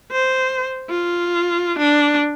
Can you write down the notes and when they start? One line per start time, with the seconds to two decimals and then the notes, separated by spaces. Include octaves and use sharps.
0.12 C5
0.90 F4
1.79 D4